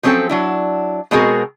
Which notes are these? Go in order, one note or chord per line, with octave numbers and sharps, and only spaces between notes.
F3 F#3 C4 C#4 A4 G5
F#3 D4 E4
B2 G#3 C4 F#4 G#4 A#4